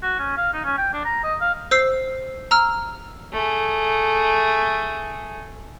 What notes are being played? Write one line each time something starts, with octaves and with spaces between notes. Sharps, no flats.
F#4
C#4
F5
D#4
C#4
G5
D4
A#5
D#5
F5
C5 E6 C7
A#5 E6 F6
A3 G#4